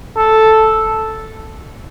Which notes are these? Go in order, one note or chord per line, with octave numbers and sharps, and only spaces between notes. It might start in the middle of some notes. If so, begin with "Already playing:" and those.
A4